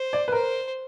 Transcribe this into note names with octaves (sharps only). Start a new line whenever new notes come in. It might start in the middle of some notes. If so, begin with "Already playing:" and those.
Already playing: C5
D5
B4
A#4 C5